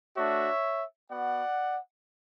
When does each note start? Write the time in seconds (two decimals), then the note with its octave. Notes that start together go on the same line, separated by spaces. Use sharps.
0.17 A3 D4 F#4 C#5 E5
1.11 B3 F#4 D5 F#5